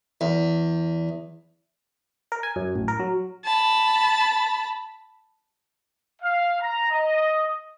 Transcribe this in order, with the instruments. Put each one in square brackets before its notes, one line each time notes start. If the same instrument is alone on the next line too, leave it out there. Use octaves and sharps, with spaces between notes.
[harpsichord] E2
[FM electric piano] A#4
G#5
F#2
A1
A#4
F#3
[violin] A5 B5
[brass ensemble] F5
A#5
D#5